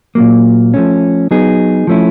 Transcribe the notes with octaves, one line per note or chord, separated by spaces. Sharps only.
A#2 F#3 A#3
F3 A3 C#4
F#3 B3 D#4 G#4
F3 A3 C#4 E4